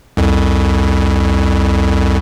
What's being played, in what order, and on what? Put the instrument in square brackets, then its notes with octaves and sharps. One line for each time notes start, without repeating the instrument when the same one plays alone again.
[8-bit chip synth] C2 F2